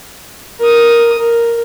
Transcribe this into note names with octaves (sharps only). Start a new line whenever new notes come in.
A#4 D#6
A#4